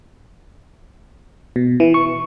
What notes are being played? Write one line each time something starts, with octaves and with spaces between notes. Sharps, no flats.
B2
E3
C#6